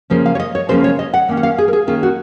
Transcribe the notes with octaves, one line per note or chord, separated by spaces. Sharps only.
C#3 F3 A#3 C#4 C5
F5
C#5
D#5
C#5
C#3 F3 A#3 C#4 C5
C#5
D#5
F#5
D#3 A#3 C#4
F#5
F5
G#4
A#4
G#4
D#3 A#3 C#4 F4
F#4